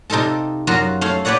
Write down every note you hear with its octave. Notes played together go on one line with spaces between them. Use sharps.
C3 D#4 F4 A4 A5
F#2 F4 F#4 A#5
A3 C#5 F5
G4 B4 C#5 D5 F#5